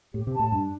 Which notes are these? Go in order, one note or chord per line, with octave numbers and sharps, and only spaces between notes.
A2 G4
C3
A5
A2
G2 D4